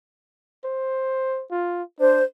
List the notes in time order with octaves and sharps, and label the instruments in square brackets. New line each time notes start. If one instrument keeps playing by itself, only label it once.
[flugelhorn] C5
F4
[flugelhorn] D4 [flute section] C5